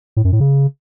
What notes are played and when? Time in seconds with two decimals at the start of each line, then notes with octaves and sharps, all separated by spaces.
0.17 A2
0.24 F#2
0.32 A2
0.40 C#3